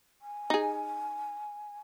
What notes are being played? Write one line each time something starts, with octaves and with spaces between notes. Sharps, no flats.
G#5
D#4 G#4